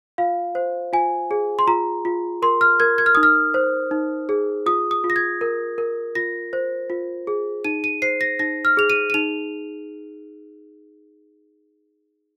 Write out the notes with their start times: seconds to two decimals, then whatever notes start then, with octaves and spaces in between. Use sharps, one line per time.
0.18 F4 F5
0.55 C5
0.93 F4 G#5
1.31 G#4
1.59 C6
1.67 F4 A#5
2.05 F4
2.42 A#4 C6
2.61 F6
2.80 A#4 G#6
2.98 G#6
3.06 F6
3.15 D#4 D#6
3.23 F6
3.54 C5
3.91 D#4
4.29 G#4
4.66 F4 D#6
4.91 D#6
5.04 F4
5.10 A#6
5.16 G#6
5.41 A#4
5.78 A#4
6.15 F4 A#6
6.53 C5
6.90 F4
7.27 G#4
7.65 D#4 D#7
7.84 D#7
8.02 C5 C7
8.21 A#6
8.39 D#4 A#6
8.65 F6
8.77 G#4 F7
8.90 D#7
9.10 D#7
9.14 D#4 F7